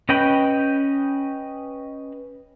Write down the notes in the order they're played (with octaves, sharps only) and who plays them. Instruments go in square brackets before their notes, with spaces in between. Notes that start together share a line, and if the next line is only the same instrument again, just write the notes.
[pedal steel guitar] C#4 B4 D#5 G5 B5